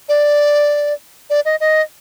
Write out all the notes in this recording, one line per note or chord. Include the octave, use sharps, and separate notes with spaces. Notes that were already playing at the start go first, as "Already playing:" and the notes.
D5
D5
D#5
D#5